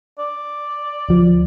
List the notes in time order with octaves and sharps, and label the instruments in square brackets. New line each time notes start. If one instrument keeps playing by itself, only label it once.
[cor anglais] D5
[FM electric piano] D2 F3